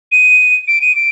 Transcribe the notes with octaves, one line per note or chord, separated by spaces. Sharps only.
D#7
D7
D#7
D7